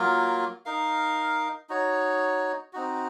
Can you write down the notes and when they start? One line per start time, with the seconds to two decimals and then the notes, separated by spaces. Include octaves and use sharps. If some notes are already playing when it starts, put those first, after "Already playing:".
Already playing: F#3 A#3 F4 A#4
0.66 D#4 A#4 F5
1.69 D#4 F#4 C#5
2.73 C4 D#4 F#4